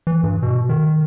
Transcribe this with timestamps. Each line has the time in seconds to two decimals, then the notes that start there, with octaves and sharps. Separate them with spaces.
0.07 E3
0.23 G2
0.42 B2
0.69 D#3